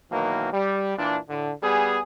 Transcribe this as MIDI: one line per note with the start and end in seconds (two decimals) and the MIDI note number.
0.10 0.49 47
0.10 0.49 51
0.10 0.49 52
0.10 0.49 54
0.10 0.49 58
0.52 0.95 55
0.97 1.17 46
0.97 1.17 52
0.97 1.17 62
1.29 1.51 45
1.29 1.51 50
1.63 2.00 55
1.63 2.00 59
1.63 2.00 68